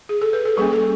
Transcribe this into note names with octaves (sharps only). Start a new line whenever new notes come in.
G#4
A4
B4
A4
G3 A#3 C#4 G#4
A4